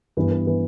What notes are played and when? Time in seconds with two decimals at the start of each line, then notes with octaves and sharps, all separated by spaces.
0.17 G2 E3 B3 B4
0.31 B4
0.47 E3 B3 B4